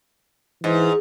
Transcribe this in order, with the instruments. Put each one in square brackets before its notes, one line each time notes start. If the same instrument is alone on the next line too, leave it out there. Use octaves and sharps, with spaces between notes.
[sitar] G#2 [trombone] E3